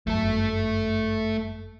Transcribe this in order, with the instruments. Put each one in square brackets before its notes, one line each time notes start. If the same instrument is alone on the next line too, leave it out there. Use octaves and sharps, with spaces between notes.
[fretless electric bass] G1 F#2 [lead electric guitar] A3 A4